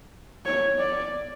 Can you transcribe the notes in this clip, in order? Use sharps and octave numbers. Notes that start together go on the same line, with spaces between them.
C#5
D5